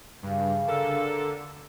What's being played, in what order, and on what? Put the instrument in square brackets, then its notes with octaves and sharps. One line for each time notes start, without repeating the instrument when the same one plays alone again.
[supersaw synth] G2 [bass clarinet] C#3
[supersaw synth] D3 [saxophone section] A4 A#4